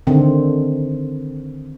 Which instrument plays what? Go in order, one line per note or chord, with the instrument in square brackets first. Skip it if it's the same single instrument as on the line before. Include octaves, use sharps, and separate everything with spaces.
[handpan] D3 D#3 C4